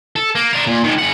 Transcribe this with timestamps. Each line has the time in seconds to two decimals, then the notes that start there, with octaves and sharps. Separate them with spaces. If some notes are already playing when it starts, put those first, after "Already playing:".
0.16 A4
0.35 A#3
0.53 D4 A#4
0.67 A#2
0.84 D#3 G#3
0.99 C#3 F#5